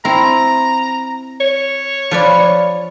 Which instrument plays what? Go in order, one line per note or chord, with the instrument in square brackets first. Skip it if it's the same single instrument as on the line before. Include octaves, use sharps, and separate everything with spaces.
[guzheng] C4 E4 [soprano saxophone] A#5
[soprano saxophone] C#5
[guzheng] F3 B4 D5